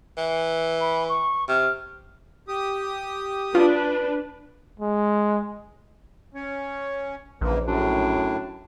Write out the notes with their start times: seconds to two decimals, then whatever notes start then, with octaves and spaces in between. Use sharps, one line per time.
0.17 E3
0.81 B5
1.09 C#6
1.48 C3 F6
2.48 G4 D#6
3.55 D4 F4 B4
4.80 G#3
6.34 C#4 C#5
7.41 A#1 C#3 E3 A#3
7.68 F#2 A2 D4